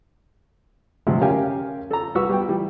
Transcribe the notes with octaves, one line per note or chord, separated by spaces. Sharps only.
D2 G2 C3 F3 F#3 G#3
C#4 G4 A#4 F5 G5 G#5
A4 A#5
C2 F#4 B4 C#6 E6
G3 B3 G5
E3 G3